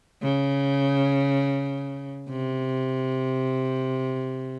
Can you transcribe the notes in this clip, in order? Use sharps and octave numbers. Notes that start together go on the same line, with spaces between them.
C#3
C3